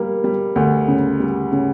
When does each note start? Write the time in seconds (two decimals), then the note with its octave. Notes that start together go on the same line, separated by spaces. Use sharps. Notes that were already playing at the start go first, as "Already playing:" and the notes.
Already playing: G3 A#3
0.24 G3
0.56 D2
0.88 C#3
1.20 G3
1.52 C#3